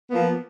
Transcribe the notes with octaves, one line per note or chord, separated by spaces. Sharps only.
F3 A#3 B3